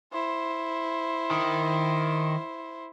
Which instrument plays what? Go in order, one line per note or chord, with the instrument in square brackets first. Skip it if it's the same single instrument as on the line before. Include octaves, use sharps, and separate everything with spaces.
[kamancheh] E4 C5
[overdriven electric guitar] D#3